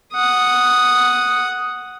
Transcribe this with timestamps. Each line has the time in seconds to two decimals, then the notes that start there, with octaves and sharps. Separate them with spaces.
0.13 F#5 D#6